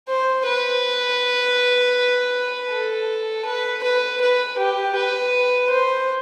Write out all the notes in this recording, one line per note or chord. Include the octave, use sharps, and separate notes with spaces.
C5
B4
A4
B4
B4
B4
G4
B4
C5